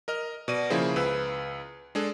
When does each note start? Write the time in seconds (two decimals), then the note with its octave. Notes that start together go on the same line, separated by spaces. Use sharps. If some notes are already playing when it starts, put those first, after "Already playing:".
0.08 A#4 D#5 F6
0.48 B2 D5 D#7
0.70 C#3 F3 A#3 E4 G#4 C5
0.96 C#2 B4 E6
1.95 G#3 D4 G#4 A4